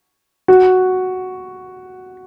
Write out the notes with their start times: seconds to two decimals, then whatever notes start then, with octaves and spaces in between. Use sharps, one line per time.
0.48 F#4